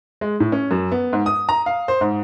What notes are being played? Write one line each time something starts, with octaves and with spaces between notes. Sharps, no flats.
G#3
A2
C#4
F#2
B3
G#2
D#6
A#5
F5
C5
G#2